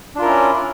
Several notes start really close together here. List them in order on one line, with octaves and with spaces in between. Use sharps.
D4 F4 A#4 E4 C#4